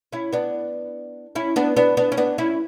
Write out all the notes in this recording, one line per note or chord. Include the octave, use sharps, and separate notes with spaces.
C#4 E4
B3 D4
C#4 E4
B3 D4
B3 D4
B3 D4
C#4
B3 D4
C#4 E4